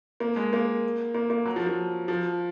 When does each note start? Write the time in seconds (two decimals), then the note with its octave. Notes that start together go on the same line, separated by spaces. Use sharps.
0.20 A#3
0.36 G#3
0.53 A#3
1.15 A#3
1.30 A#3
1.46 F#3
1.56 F3
1.67 F3
2.08 F3